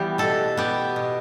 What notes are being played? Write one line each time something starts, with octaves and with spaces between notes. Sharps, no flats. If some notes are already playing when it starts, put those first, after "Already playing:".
Already playing: E3 G3 B3 G4
B2 A4
B3 G4
B2